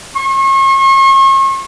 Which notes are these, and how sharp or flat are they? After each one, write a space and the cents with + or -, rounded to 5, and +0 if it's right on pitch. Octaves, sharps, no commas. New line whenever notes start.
C#6 -40